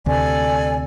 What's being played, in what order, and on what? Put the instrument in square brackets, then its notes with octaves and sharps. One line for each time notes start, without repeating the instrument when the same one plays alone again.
[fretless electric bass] D2 C3 [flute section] A4 D5 G#5